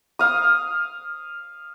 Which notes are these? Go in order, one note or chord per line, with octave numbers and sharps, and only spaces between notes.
F5 D#6